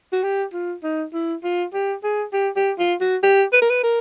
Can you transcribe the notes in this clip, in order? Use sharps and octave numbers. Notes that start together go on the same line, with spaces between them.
F#4
G4
F4
D#4
E4
F4
G4
G#4
G4
G4
F4
F#4
G4
B4
A#4
B4
A#4